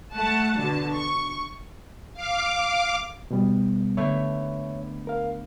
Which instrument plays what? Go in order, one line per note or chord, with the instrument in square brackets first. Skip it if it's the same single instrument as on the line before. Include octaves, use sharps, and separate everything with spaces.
[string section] A3 F#5 A5
B2 D3 A5
C#6
[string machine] F5 D6
[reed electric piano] B2 G3 B3
[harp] D3 A3 B3 [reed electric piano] C#5 E5
[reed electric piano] A#4 F5